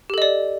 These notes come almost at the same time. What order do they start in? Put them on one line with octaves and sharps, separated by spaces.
G4 A4 D#5 D5